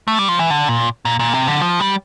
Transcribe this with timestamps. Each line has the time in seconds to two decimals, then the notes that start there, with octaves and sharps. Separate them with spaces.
0.08 A3
0.19 G3
0.29 F3
0.39 E3
0.50 D3
0.69 A#2
1.05 A#2
1.19 A#2
1.33 C3
1.47 D3
1.62 F3
1.80 G3